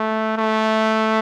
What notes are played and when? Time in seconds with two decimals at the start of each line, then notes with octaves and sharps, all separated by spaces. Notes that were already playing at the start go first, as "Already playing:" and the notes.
Already playing: A3
0.37 A3